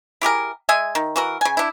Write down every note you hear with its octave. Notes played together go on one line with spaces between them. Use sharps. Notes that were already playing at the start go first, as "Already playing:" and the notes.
E4 G4 G#4 A#4
G#3 D#5 E5 G#5
D#3
E3 F#4 A#4
C#3 G#5
D4 E4